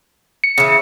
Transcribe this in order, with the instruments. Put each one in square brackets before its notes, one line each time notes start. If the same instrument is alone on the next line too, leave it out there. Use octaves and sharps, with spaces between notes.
[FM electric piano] C#7
[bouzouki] C#3 E3